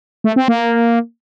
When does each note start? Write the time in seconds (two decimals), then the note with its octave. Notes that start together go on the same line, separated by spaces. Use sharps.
0.24 A3
0.36 C4
0.48 A#3